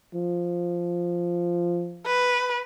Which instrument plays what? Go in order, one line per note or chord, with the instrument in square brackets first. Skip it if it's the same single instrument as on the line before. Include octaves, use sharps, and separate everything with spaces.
[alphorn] F3
[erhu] B4